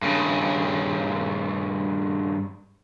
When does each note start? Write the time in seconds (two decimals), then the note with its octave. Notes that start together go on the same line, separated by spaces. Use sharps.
0.02 G2 C#3